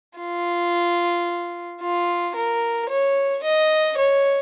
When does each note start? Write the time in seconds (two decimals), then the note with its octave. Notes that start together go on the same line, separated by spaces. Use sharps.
0.19 F4
1.81 F4
2.35 A#4
2.89 C#5
3.43 D#5
3.97 C#5